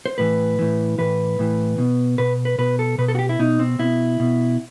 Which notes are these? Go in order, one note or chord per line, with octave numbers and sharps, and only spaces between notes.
C5
A2 E3 B4
A2 E3
A2 E3 B4
A2 E3
B2
B2 B4
B4
B2 B4
A4
B2 B4
A4
F#4
G4
E4
B2 D#4
C4
B2 E4
B2